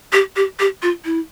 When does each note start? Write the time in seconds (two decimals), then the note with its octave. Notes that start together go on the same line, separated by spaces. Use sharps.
0.13 G4
0.36 G4
0.60 G4
0.82 F4
1.05 E4